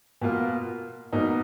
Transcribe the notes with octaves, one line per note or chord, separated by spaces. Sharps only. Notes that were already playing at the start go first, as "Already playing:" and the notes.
B2 A#3 F4
B2 A#3 D#4